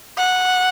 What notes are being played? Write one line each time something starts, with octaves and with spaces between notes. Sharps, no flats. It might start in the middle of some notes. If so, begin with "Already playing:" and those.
F#5